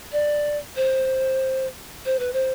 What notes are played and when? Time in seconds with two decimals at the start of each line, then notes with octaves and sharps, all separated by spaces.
0.12 D5
0.76 C5
2.06 C5
2.19 B4
2.33 C5